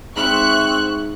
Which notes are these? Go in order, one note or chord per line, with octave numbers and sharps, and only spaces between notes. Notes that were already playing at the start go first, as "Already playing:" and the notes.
G#2 C4 E5 C#6 F#6